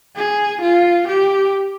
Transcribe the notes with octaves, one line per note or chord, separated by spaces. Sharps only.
G#4
F4
G4